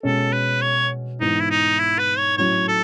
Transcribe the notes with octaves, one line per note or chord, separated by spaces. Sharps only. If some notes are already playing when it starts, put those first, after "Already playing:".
B2 G#3 C#4 A4
B4
C#5
G#2 E3 B3 D#4
E4
D#4
E4
B4
C#5
A2 F#3 C#4 C#5
A4